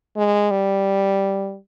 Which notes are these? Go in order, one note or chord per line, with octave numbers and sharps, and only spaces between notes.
G#3
G3